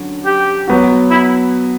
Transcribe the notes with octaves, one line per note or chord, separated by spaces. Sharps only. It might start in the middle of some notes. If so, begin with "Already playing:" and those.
Already playing: D3 F#3 C#4
G4
F#3 B3 F#4
E4